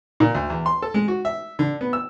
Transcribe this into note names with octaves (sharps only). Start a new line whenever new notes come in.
A#2
D2
E2
C6
A4
G#3
F#4
E5
D3
B3
E6